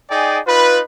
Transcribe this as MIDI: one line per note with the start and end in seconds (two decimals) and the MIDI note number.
0.11 0.39 63
0.11 0.39 68
0.11 0.39 74
0.11 0.39 79
0.11 0.39 80
0.47 0.80 63
0.47 0.80 65
0.47 0.80 71